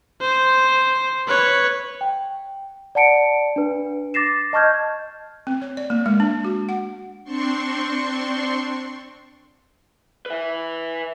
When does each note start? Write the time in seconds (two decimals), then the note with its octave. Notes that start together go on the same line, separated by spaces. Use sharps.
0.22 C5
1.28 B4 C#5
2.01 G5
2.95 D5 F#5 A5 C#7 D7
3.56 D4 B4
4.14 D6 A6 A#6 C7 E7
4.53 D#5 A5 C#6 F6 G6 G#6
5.47 C4
5.62 C#5
5.77 D5
5.90 A#3
6.06 G#3
6.20 D4
6.45 F#4
6.69 F#5
7.24 C4 D4 C6 C#6
10.26 B4 E5